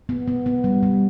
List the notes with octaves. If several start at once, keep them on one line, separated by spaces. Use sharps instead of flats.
B3
B3
B3
G3
G3